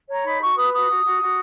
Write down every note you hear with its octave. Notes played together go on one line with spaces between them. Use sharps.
C#5 A#5
D#4 B5
F#4 C#6
B4 D#6
F#4 D#6
F#4
F#4
F#4